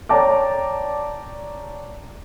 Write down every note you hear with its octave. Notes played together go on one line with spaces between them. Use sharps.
C#5 D5 G5 A5 A#5 D6